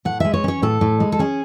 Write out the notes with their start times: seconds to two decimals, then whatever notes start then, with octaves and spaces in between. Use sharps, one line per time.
0.05 A2 F#5
0.20 G#3 E5
0.34 C#5
0.44 C#4 C#5
0.62 A2 A4
0.81 A2
1.00 G#3
1.12 A4
1.19 C#4 G#4